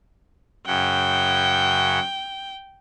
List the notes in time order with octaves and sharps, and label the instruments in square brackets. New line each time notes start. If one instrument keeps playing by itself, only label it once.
[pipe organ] F#2 C#3 F#5 [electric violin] G5